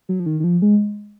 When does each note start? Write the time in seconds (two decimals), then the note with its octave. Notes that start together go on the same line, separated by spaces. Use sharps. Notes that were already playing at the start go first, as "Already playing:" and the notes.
0.09 F#3
0.20 F3
0.26 D#3
0.40 D#3
0.44 F3
0.62 G#3